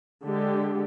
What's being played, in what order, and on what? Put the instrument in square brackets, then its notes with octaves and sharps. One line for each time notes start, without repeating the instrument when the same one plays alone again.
[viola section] D3 G#3 G4